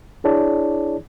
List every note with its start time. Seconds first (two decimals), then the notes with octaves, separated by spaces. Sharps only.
0.24 D4 E4 G#4 C#5 D5 A5